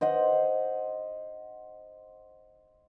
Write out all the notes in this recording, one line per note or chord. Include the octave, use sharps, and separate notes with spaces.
C5 D#5 F#5